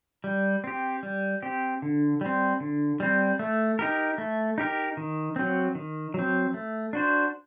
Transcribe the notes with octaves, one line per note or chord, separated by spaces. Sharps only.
G3
C4 G4
G3
C4 G4
D3
G3 C4
D3
G3 C4
A3
D#4 G4 A#4
A3
D#4 G4 A#4
D#3
F#3 C4
D#3
F#3 C4
A3
D4 F#4 C5